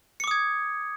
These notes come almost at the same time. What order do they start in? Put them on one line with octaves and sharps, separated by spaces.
C#7 D6 D#6 G#6